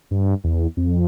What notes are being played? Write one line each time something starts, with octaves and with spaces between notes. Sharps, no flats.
G2
E2
F2